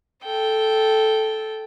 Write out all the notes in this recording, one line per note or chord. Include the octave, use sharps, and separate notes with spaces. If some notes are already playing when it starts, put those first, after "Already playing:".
A4 G5